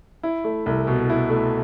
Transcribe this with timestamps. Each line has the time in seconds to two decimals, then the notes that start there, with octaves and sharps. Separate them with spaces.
0.23 E4
0.44 A3
0.66 C2
0.87 B2
1.10 E4
1.30 A3